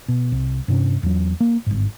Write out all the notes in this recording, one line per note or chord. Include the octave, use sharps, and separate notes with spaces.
B2
C2
G2 C3 C#4
E2 F#3
A#3
G1 G#2